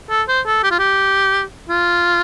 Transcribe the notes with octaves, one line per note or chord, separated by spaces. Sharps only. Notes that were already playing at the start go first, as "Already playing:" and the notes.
A4
C5
A4
G4
F4
G4
F4